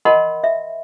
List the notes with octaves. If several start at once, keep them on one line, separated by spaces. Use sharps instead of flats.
A#4 D#5 F#5 A5 B5 C6
E5